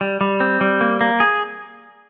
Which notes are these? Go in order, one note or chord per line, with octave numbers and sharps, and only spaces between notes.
G3
G3
C4
G3
A#3
A#3
G#4